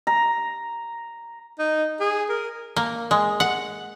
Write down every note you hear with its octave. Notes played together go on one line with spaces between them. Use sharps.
A#5
D#4
G#4
A#4
A#3
G#3
F#5